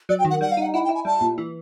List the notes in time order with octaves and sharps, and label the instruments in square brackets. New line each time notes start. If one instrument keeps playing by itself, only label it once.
[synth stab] F#3 [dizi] D5
[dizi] G5
[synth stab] D#3
[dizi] F#5
[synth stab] G3 [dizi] F#5
[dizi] F5
[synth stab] D#4 [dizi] F#5
[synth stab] E4 [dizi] F#5
[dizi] G5
[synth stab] E4
[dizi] G#5
[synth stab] G3 [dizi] A5
[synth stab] A#2
E3